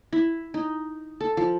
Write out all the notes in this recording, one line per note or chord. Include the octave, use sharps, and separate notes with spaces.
E4
D#4
A4
F3